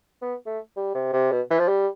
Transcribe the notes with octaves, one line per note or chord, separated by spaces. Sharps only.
B3
A3
G3
C3
C3
B2
E3
F3
G3